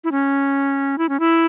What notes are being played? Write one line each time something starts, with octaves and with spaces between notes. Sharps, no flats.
E4
C#4
E4
C#4
E4